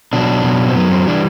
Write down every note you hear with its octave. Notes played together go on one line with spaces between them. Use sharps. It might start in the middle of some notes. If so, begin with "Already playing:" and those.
B2 F#3 D4
B2 F#3
C4
F#2 F#3 B3
C4
E3 G3 D4